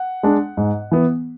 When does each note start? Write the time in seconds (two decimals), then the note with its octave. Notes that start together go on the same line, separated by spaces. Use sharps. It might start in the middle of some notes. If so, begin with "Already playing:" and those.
Already playing: F#5
0.23 G#3 D4
0.57 G#2
0.91 E3 B3